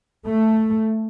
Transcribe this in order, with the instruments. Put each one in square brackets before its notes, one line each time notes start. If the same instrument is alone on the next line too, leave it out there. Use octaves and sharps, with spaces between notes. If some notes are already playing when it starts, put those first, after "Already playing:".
[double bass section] A3